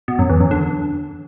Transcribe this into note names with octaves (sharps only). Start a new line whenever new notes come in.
B2
F#2
E2
F#2
D3